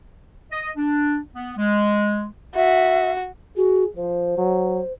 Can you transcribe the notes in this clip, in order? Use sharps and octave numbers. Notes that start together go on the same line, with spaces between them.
D#5
D4
B3
G#3
F#4 E5
F#4 G#4
F3 C5
F#3